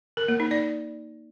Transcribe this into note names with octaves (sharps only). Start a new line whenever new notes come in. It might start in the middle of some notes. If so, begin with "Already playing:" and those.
A#4
A#3
D#4
D5